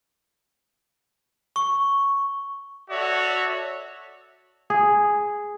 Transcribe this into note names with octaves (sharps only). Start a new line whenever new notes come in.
C#6
F#4 A4 C#5 D5 E5
G#4